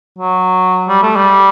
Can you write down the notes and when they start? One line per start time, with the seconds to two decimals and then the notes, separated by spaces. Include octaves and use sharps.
0.19 F#3
0.88 G3
1.02 A3
1.16 G3